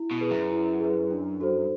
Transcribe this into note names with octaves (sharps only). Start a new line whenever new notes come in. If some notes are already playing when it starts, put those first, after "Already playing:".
Already playing: E4
B2
G#4 B4
F#2
E4
G#4 B4
D4
F#4 A4 C5